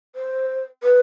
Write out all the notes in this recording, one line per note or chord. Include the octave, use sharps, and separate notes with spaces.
C5
B4